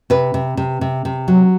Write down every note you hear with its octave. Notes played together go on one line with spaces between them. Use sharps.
C3 B4
C3
C3
C3
C3
F#3